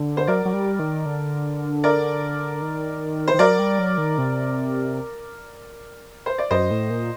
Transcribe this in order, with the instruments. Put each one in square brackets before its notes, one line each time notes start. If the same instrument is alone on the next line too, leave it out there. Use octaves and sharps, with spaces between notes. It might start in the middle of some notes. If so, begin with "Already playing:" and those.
Already playing: [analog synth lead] D3
[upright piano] C5
[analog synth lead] F#3 [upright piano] A#4 D5
[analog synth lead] F#3
G3
D#3
D3
[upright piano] A#4 D5
[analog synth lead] D#3
[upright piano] C5
[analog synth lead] D#3
[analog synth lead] F#3 [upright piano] A#4 D5
[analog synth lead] G3
F#3
D#3
C3
[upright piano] C5
D5
[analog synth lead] F#2 [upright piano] C5 D#5
[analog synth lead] A2
A#2